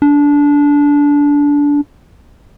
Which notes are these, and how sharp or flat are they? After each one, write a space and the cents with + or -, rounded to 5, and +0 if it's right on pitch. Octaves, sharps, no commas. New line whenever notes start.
D4 -20